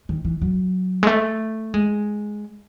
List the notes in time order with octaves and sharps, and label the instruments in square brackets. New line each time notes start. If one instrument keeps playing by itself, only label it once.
[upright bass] D#3
E3
F#3
G#3
A3
G#3